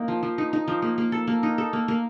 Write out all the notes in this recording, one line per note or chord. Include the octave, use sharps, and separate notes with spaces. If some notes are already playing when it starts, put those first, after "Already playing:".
Already playing: A#3 D#4
F3
F3
D#4
D#4
F3
A#3
A#3
A4
A#3
D#4
A4
A#3
A#3